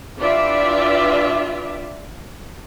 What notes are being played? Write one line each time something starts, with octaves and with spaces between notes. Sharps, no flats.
E3 D4 F4 G4 D5 E5